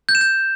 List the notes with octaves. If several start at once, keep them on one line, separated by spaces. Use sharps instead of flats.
G6
E7
G6